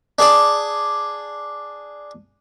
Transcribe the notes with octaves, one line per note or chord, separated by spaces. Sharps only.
D4 G#4 D5